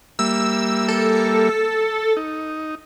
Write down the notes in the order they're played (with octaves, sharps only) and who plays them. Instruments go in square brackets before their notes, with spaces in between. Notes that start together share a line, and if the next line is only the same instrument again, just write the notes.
[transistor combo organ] G3 A#3 E5 [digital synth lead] E6
[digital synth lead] A4
[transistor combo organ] D#4